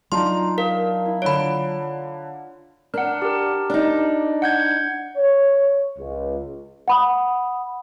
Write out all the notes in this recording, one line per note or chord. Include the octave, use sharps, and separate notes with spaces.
F#3 D4 D#4 F4 A#5 C6
A#4 F5
E4
D3 F4 C#5 B5 D7
D4 A#4 F#5
G4 A#4
D4 D#4
F#5 G6 G#6
C#5
C#2
F#5 B5 D#6